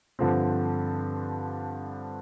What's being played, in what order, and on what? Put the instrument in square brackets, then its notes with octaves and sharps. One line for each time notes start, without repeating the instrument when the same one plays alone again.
[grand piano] G2 D3 F3 C4